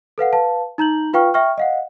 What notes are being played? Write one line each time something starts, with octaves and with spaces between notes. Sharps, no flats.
A4 B4 F5 F#5
B4 F5 A5
D#4 A#5 G6 F#7
F4 B4 F5 G5 C#6 F6
E5 G5 C#6 F6
D#5 F5 F#5